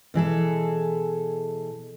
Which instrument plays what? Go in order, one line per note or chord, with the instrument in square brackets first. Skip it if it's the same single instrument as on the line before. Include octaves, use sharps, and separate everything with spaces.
[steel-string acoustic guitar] B2 E3 G#4 A4